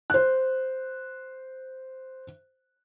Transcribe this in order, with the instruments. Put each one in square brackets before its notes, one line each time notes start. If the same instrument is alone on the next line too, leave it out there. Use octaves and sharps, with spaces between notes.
[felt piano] C5 F#6